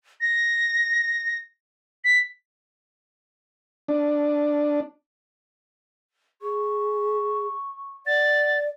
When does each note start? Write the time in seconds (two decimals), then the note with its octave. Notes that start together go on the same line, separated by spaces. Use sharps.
0.21 A#6
2.05 B6
3.88 D4
6.42 G#4 C#6
8.06 D5 F#5 A6